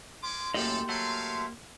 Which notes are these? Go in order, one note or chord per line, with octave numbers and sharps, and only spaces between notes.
C#4 D4 C6 D6
F#2 A2 A#3 G4 A4 D#5
F#3 A3 E4 F5